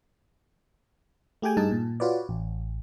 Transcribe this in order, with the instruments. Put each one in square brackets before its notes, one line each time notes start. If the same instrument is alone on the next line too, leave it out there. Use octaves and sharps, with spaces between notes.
[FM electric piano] A3 G4 G#4 G5 G#5
G2 D#4 G#4 A5
A#2
F4 F#4 B4 C#5 D5
A1